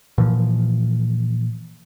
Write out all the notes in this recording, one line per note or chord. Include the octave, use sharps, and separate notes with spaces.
A#2 E3 F3